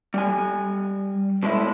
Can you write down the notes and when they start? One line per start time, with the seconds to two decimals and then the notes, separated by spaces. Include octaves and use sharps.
0.14 G3 G#5
1.43 B2 G#3 A3 E4